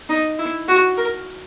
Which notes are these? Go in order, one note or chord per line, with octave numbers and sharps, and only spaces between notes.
D#4
E4
F#4
A#4